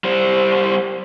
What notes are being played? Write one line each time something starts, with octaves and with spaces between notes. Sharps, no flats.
G3 C5